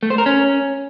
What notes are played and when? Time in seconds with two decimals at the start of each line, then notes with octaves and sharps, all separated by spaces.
0.03 A3
0.10 C5
0.18 A#4
0.26 C#4